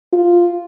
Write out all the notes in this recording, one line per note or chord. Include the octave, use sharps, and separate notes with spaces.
F4